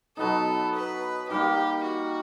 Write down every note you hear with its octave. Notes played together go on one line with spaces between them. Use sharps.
B2 F#3 B3 D#4 A4
B4
D#3 G3 A#3 G4
F#4